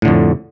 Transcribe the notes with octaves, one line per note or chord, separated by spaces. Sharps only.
F2 A2 D3